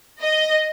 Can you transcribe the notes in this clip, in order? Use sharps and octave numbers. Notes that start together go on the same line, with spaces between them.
D#5